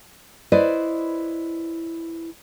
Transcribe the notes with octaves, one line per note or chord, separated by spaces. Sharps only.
E4 B4 C5 D5 D#5